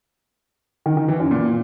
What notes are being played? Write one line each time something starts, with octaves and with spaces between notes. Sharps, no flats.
D#3
D#3
E3
F#2
A#2